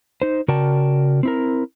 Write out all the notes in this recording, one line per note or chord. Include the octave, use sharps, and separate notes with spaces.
D#4 C5
C#3 F#4 A#4 D5 G5 A5
C4 E4 A#4